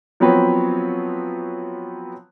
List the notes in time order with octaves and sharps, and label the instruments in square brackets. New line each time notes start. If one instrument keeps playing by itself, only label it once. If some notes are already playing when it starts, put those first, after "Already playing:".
[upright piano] F3 F#3 B3 C4 B4 C#5